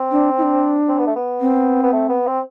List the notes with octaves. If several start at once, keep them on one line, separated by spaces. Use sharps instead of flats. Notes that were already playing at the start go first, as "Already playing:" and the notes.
Already playing: C4
D4
E4
D4
C4
B3
A3
B3
C4
B3
A3
B3
C4